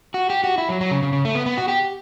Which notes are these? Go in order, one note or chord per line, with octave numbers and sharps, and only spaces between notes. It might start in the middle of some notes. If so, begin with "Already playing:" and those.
F#4
G4
F#4
E4
F#3
F#3
C#3
C#3
C#3
A3
B3
B3
F#4
G4